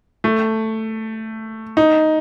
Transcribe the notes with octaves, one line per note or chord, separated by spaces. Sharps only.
A3
D#4